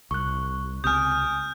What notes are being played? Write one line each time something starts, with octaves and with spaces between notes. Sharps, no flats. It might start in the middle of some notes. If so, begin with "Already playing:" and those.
C2 C#6 F#6
C#2 C3 G#5 D#6 F6 G6